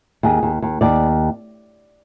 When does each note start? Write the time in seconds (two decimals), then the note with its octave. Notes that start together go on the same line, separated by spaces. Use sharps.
0.23 D#2 G#4
0.43 D#2
0.62 D#2
0.81 D#2 D5